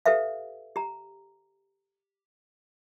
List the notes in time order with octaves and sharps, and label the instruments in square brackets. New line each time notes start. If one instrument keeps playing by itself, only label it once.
[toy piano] G4 A4 B4 E5 F5
G4 A#5